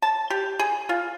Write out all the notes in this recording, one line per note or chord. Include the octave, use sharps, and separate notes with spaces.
A5
G4
G#4
F4